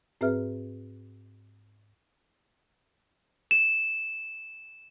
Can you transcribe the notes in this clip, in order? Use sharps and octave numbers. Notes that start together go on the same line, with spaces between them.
G#2 C4 G#4 B4 E5 F6
E7